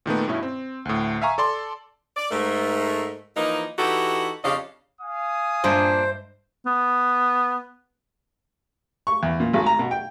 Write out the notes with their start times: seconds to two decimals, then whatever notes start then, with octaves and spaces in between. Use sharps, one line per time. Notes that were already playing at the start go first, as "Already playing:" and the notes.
0.06 A#2 D#3 A3 B3
0.28 G2 B2 C#4 E4
0.43 C4
0.85 D2 A2
1.22 E5 F5 G#5 A#5 C#6
1.38 A4 D5 C6
2.17 D5
2.31 G#2 A3 A#4
3.36 E3 F3 A#3 D#4
3.79 E3 D#4 F#4 G4 A4
4.44 F2 C#3 D4 G4 D#5 F5
5.01 F5 G#5 D#6
5.64 G2 A#2 D4 C5 D#5 E5
6.66 B3
9.07 C#6
9.23 E2
9.40 A#2
9.53 G#1
9.66 A#5
9.79 B2
9.91 G5